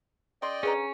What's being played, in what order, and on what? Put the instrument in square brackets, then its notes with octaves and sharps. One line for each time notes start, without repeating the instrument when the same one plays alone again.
[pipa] C#3 C6 [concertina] D5 D#5 G5
[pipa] D3 B4 A#5 [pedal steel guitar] C#4 [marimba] G#4